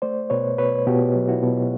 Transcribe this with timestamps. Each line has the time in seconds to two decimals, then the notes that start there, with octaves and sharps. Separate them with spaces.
0.02 A3 C5 D5
0.30 B2 B4 C#5
0.58 B2 B4 C#5
0.86 B2 F4 G4
1.15 F#3
1.28 E4 F#4
1.42 B2